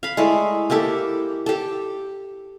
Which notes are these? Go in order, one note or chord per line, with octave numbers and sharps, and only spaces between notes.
F5 B5
G#3 A3 E4 D5
A#3 E4 G4 A4
G4 A4